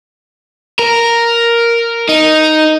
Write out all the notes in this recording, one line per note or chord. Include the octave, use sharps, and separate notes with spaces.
A#4
D#4